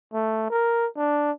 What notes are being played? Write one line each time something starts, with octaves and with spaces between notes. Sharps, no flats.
A3
A#4
D4